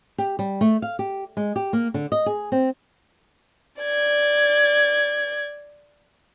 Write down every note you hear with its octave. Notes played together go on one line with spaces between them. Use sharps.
G4
G3
A3
F5
G4
G#3
G4
A#3
D3
D#5
G#4
C4
D5 G#6